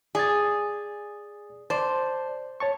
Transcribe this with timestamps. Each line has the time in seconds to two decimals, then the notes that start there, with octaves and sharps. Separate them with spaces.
0.15 G#4 D5 G#5 A6
1.70 C5 D5 A5
2.60 C#5 A5 C#6